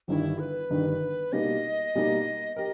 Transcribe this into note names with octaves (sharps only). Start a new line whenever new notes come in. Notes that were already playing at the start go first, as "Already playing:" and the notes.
G1 G2 D#3 E4
B4
G1 G2 D#3
B2 G3 A#3 D#4 D#5
B2 G3 A#3 D#4
G4 A#4 D#5